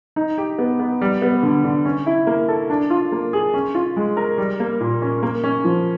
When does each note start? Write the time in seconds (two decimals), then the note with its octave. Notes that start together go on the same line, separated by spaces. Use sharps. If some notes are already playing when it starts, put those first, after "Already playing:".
0.16 D#4
0.38 G4
0.58 B3
0.80 B3
1.01 G3
1.22 B3
1.43 D3
1.64 D3
1.85 C#4
2.06 E4
2.27 A#3
2.48 A4
2.70 D4
2.90 F4
3.12 A#3
3.33 G#4
3.54 C#4
3.75 F4
3.97 G#3
4.17 A#4
4.38 G3
4.60 A#3
4.80 A#2
5.02 C#4
5.23 A#3
5.44 C#4
5.64 F3